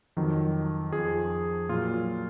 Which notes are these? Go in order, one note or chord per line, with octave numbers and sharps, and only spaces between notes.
F2 D#3 F#3
F2 F3 G#4
A#2 F#3 F4